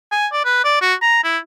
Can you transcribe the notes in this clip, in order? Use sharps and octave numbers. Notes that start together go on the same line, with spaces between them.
G#5
D5
B4
D5
F#4
A#5
E4